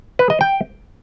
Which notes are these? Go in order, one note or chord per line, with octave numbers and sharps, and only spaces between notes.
B4
D#5
G5